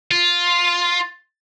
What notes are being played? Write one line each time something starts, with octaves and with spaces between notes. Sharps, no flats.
F4